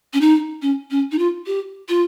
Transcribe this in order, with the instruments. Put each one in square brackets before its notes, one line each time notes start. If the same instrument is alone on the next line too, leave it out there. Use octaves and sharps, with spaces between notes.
[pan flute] C#4
D#4
C#4
C#4
D#4
F4
G4
F4